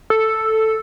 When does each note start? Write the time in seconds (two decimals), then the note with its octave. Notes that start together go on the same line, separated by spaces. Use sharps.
0.10 A4